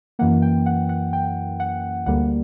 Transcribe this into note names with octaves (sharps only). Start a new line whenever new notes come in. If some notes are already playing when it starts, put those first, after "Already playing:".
F#2 E3 A#3 F#5
G5
F#5
F#5
G5
F#5
D2 D3 G3 A#3 F#5